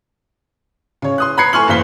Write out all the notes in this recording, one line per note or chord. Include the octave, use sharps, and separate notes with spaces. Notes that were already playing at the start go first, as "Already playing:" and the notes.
C#3 C#5
C6 D#6 F#6
A#5 B5 F#6 G#6 C7 C#7
A3 G#5 C6 C#6 F6 F#7
F#1 E3 C5 F5 B6 G7